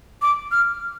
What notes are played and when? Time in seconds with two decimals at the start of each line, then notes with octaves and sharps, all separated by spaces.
0.22 D6
0.52 F6